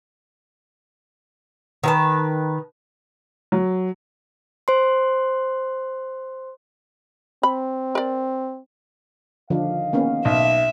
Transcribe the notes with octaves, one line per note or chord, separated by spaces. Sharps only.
D#3 B4 A5
F#3
C5 C6
C4 B5
A#4 D5
D3 D#3 F3 D4 D#5 F5
A#3 B3 C#4
B1 E5